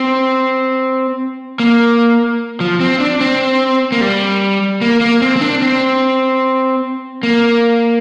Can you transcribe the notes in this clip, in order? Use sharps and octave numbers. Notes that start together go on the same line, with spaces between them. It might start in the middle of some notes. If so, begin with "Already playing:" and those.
Already playing: C4
A#3
F3
C4
D4
C4
A#3
G3
A#3
A#3
C4
C4
D4
C4
A#3